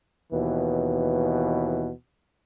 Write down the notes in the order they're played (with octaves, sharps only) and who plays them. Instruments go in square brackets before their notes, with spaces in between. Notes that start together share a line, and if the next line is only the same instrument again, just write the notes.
[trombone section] D#2 B2 E3